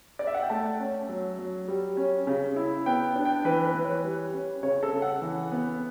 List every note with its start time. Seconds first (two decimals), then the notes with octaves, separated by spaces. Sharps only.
0.19 D5
0.27 E5
0.34 F#5
0.42 G5
0.50 A3 A5
0.80 C#4
1.09 F#3
1.39 F#3
1.68 G3
1.97 C#4
2.27 C#3
2.56 E4
2.86 B3 G5
3.16 D4
3.25 G5
3.45 E3 B4
3.65 B4
3.74 E3
3.84 C#5
4.04 G3
4.34 C#4
4.63 C#3 C#5
4.83 A4
4.93 C#3
5.02 F#5
5.22 E3
5.52 B3